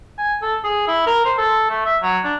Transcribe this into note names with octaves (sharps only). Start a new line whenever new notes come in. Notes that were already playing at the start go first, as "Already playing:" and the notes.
G#5
A4
G#4
E4
A#4
C5
A4
A3
E5
F#3
D4